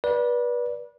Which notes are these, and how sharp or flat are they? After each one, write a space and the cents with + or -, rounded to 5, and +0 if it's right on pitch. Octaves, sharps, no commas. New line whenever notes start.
B4 -30 D5 -5